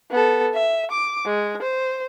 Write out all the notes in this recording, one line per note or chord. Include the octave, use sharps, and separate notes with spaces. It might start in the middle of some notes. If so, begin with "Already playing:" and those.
B3 A4
E5
D6
G#3
C5